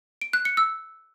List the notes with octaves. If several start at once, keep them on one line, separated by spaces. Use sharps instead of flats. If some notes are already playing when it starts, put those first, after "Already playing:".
D7
F#6
C#7
E6